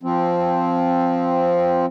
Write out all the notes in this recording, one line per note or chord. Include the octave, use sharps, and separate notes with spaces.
F3 C4